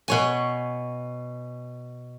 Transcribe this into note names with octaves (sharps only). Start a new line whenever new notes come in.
B2 C#5 G#5